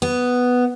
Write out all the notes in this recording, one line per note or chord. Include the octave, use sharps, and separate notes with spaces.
B3